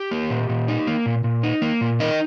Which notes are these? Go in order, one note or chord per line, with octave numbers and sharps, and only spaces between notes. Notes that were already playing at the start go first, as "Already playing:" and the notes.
Already playing: G4
A#3
A#2
A#2
D#4
A#3
A#2
A#2
D#4
A#3
A#2
D#4 A#4 D#5